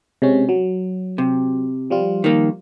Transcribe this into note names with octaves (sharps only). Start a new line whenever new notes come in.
C3 G#3 C#4
F#3
C3
F3 G3 F4
D#3 A#3